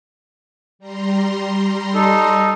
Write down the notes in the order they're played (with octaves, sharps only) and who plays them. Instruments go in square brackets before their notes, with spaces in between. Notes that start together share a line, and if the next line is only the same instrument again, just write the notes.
[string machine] G3 A#5 C6
[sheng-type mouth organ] D#4 A4